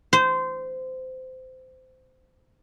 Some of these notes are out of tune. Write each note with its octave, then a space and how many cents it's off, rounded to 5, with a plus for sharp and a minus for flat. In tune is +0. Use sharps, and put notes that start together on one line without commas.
C5 -20